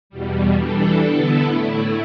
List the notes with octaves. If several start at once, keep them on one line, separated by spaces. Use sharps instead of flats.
E2 B2 G3
E3 G3 D4 A4
D3 B3 E4 A4
A2 A3 E4